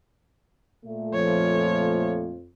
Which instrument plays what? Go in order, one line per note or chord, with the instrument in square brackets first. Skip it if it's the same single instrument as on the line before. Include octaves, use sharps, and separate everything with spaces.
[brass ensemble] A#2 A3
[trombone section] F2 F3 [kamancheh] C#5